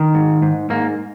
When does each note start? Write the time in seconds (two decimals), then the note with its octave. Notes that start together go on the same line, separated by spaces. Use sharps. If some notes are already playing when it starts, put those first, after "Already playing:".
Already playing: D#3
0.15 G#2
0.42 G#2
0.70 G#2 A#3